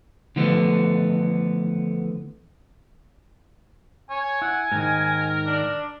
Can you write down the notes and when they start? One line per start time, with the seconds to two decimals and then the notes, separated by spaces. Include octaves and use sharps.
0.36 D3 E3 F3 A3 B3
4.10 C#5 G#5
4.42 E4 F#5
4.72 G#2 D#3 A#4
5.47 D4